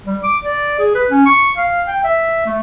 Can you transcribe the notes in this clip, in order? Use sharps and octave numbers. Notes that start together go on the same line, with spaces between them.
G3
D6
D5
G#4
B4
C#4
C#6
F5
G5
E5
A3